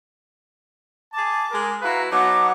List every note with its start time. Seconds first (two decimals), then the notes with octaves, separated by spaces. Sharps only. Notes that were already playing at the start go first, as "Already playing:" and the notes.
1.14 G#4 A5 D6
1.51 G#3 G#4 A#4
1.82 E4 F#4 B4 F5 A#5
2.12 F#3 B3 D#4 F#5 A5 D6